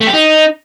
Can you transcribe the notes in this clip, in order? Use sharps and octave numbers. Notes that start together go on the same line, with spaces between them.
A3
G4
D#4